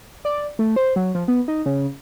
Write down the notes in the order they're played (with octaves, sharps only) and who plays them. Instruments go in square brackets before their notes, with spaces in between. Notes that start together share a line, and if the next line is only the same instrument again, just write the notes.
[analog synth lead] D5
A3
C5
F#3
F3
B3
D#4
C#3